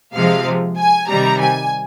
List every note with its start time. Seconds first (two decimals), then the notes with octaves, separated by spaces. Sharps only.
0.14 C3 F3 G#3 F5
0.78 G#5
1.09 C3 D#3 G3 A#5
1.40 G#5